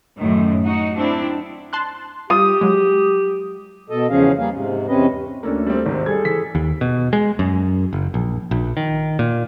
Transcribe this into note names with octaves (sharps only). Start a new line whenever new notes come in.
F#2 A2 D#3
D#4 F#4
C4 D4 E4
A5 C6 F#6
G3 F4 G4 D#6
F#3 G#3
B2 A4 D#5
E2 C#3 F3 C#4 G#4 F5
G3 A#3 G#4 F5
G#2 C3
E2 C3 C4 C#4 B4 D#5
D2 A#3 C#4 D4 A4
G3 C4
G#1 C3 D#3
G3 G#4 A4 G#6
E3 B6
D#2
B2
G#3
F#2
F#1
A#1
A#1
D#3
A#2